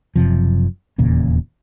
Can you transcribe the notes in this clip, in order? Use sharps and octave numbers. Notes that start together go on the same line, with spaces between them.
F#1 F#2 C3 F3
D#1 E2 A#2 C#3